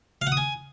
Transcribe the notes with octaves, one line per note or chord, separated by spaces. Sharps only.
F5
F#5
D#6
G#5